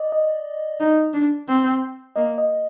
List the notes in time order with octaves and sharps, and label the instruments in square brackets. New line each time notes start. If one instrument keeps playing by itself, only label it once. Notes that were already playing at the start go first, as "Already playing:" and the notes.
Already playing: [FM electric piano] D5 D#5
D#5
[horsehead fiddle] D#4
D4
C4
[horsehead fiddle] A#3 [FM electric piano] D#5
[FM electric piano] D#5